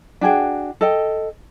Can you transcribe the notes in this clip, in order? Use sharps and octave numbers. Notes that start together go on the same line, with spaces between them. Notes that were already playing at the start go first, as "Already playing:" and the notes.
D4 F#4 G#4 G5
A4 D#5 G5